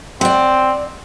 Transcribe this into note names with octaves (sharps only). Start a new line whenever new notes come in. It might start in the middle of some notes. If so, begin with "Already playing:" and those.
C4 D5 F#5